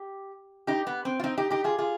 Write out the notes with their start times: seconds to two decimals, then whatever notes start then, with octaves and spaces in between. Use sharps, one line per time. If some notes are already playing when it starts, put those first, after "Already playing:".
Already playing: G4
0.67 D#4 G4
0.87 B3
1.05 C4
1.20 F4
1.24 C4 D#4
1.37 D#4 G4
1.51 D#4 G4
1.64 F4 G#4
1.78 F4 G#4